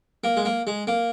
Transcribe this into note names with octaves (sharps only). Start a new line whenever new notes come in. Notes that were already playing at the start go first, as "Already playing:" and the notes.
A#3
G#3
A#3
G#3
A#3